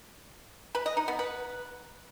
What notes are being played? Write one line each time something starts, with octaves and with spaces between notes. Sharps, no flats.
B4
D#5
D#4
B3
B4